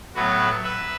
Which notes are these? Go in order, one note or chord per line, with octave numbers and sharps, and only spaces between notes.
A2 F#3 B3 F#4 B4
B4 E5